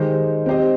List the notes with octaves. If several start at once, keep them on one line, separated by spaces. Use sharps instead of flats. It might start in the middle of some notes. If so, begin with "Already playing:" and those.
Already playing: D#3 G#3 D#4 G4 C5
C4 G4 C5 D#5